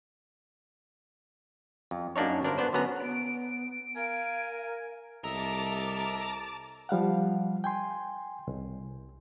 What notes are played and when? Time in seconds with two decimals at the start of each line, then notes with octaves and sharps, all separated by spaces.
1.91 F2
2.16 F#2 A#3 D4 D#4 C#5
2.43 G1 D4 A#4 C5
2.58 B3 D4 C5
2.73 D3 F#3 B3 C#4 A#5
3.00 B3 D7
3.96 A#4 F5 G#5
5.24 C2 A4 A#4 D#5 E5 A5 D6
6.89 F3 G3 F5 F#5
7.64 G5 G#5 C6
8.47 C2